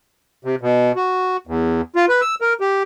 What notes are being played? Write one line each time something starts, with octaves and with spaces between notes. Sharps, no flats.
C3
B2
F#4
E2
F4
B4
E6
A#4
G4